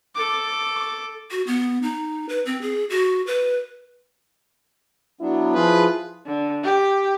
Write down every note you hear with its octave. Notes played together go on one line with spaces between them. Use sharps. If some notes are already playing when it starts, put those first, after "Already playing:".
A4 D6
F#4
B3
D#4
B4
C4
G#4
F#4
B4
F#3 B3 D4 E4
F3 F4 G#4 B4
D3
G4